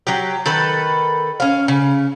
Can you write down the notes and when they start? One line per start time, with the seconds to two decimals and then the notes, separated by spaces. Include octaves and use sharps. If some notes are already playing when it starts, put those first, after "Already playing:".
0.07 F#3 G4
0.46 D#3 A4 B4
1.40 C#4 F5
1.68 C#3